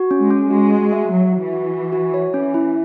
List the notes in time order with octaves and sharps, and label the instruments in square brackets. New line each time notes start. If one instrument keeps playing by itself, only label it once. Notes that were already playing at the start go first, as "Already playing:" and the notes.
Already playing: [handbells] F#4
C#4
[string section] G#3
[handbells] C#4
[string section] G#3 [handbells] F#4
[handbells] F#4
E5
[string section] F#3 [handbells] F#4
[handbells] F#4
[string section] E3
[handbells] F#4
F#4
F#4
C#5
[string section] E3 [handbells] C#4
[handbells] E4